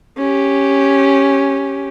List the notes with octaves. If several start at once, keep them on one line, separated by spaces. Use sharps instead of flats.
C#4 G4